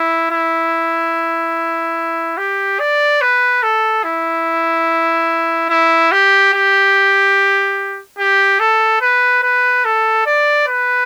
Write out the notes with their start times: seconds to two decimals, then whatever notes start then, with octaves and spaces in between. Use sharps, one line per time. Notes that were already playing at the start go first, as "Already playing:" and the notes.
Already playing: E4
0.31 E4
2.38 G4
2.80 D5
3.21 B4
3.63 A4
4.04 E4
5.69 E4
6.12 G4
6.53 G4
8.18 G4
8.60 A4
9.01 B4
9.43 B4
9.85 A4
10.26 D5
10.67 B4